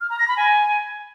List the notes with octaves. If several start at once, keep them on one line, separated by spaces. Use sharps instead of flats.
F6
A#5
A#6
B5
G#5